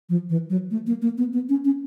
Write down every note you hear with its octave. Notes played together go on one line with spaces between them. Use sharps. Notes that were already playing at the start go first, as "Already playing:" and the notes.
F3
E3
F#3
A3
A#3
A#3
B3
B3
C#4
C#4